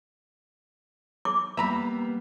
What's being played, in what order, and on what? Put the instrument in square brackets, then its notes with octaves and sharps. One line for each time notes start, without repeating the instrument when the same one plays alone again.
[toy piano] D6
[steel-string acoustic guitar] G3 A#3 B3 [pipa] E5 A#5 B5